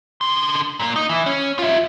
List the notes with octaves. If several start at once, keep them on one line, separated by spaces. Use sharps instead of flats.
D3 C6
A#2 A#3
D#4
E3
C#4
F4 E5